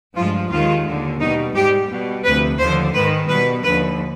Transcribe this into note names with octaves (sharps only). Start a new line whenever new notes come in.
G2 F3 G#3 F4
D#2 D#3 G#3 F4
D#2 D3 G#3
B2 G3 D#4
G#2 G3 G4
B2 G3
D2 C3 F3 B4
D#2 D3 F3 C5
G#2 D#3 G#3 B4
B2 G3 B4
D#2 D3 F3 B4